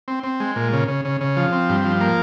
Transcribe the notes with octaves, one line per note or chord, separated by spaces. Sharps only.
C4
C4
G#3
A#2
C#3
C#3
C#3
C#3
F3
C4
G2
F3
A#3